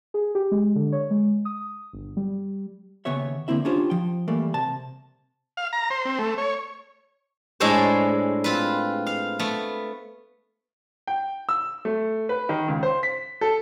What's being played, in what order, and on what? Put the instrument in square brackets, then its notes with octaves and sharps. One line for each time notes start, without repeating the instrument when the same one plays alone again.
[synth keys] G#4
G4
G#3
D3
C#5
G#3
D#6
G1
G3
[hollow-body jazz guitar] D#2 C#3 B3 C#5 E5
D3 A#3 C4 E4 E5
C#4 D4 F4 G4 C5
F3 G5
E3 G3 A3 A#3
C3 A5
[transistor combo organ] F5
A#5
C5
C4
A3
C#5
[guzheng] A2 G#3 D4 A4 C5 C#5
C4 F4 B4
F5
A3 B3
[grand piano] G5
E6
A3
B4
D#3
C#2
C5
B6
A4